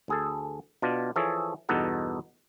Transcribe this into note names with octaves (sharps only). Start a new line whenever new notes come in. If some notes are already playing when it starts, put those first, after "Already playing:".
D2 G#4 A4
B2 D4 F4
E3 F3 G#4 A4 C#5
E2 G2 B2 D#4 A4 F#5